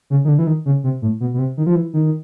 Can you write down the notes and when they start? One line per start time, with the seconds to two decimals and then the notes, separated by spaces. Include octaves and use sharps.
0.10 C#3
0.25 D#3
0.29 D3
0.38 E3
0.47 D#3
0.66 C#3
0.84 C3
1.02 A2
1.20 B2
1.34 B2
1.39 C3
1.57 D#3
1.66 F3
1.75 E3
1.93 D#3